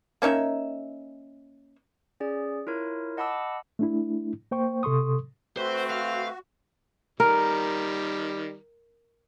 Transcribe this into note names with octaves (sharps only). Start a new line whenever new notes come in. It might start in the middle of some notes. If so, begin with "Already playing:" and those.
A#3 C#4 D#4 E5
C#4 G#4 D5
E4 F4 A#4 C#5
D#5 F#5 A5 B5 D6 E6
A3 D4 E4
A#3 C5 G5 C#6
C3 A4 C6 C#6 D#6
A3 C4 F#4 B4 C5
F5
D#3 G3 A#4